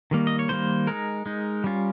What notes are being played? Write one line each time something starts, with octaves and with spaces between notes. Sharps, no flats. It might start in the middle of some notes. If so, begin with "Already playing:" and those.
D#3 G3 A#3
D#5
C#5
D#3 G3 A#3 C5
G#3 D#4 A#4
G#3 D#4
G3 C#4 F4